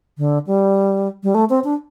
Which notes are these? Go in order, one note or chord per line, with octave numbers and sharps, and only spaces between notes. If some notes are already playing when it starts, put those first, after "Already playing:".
D3
G3
G3
A3
C4
D4